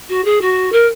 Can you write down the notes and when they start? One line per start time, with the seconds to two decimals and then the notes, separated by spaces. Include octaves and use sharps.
0.09 F#4
0.25 G#4
0.41 F#4
0.72 A#4